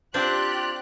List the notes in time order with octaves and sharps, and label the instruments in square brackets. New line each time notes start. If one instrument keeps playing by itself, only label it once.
[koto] C4 D4 C5 [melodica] F4 D5 [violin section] G4 F#6